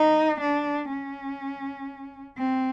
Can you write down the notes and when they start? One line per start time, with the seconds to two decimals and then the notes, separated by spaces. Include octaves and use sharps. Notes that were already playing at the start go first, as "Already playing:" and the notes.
Already playing: D#4
0.40 D4
0.89 C#4
2.37 C4